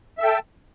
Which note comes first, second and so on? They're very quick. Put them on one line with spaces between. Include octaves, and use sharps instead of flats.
E5 A4 G5 A5